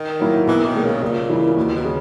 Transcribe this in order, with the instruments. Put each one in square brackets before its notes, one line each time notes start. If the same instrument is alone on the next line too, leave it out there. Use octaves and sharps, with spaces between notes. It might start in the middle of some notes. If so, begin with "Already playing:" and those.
Already playing: [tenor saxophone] D#3
[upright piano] F#3 A#3 E4 A#4
[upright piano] B1 [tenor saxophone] E3
[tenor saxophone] D#3
[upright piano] A#2 G#3
[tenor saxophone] C#3
[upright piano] C#2 [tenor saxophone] A#2
[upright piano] C#3 E3 A#3 E4
[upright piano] D#2 [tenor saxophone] B2
[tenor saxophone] B2
[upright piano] C#3